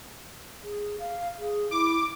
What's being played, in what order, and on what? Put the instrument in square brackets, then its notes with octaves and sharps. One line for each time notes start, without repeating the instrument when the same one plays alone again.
[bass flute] G#4
F5
G#4
[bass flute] E4 [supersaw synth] D6